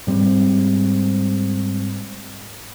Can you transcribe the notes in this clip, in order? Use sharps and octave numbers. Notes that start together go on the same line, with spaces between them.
G#2 G3 C4